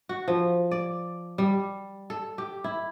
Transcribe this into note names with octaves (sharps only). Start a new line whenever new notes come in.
F#4
F3
D5
G3
A4
G4
E4